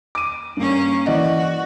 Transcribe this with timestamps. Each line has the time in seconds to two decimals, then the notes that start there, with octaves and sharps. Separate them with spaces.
0.15 D6 D#7
0.57 G2 A#3 C#4
1.06 E3 F#4 D5 D#5